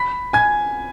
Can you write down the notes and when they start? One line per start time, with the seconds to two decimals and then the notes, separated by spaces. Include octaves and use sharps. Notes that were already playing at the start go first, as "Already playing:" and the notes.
Already playing: B5 B6
0.33 G#5 G#6